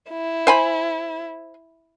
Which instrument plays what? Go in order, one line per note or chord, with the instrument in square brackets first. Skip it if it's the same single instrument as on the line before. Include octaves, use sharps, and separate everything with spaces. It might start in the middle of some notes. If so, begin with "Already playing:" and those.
[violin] E4
[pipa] C5 G#5 B5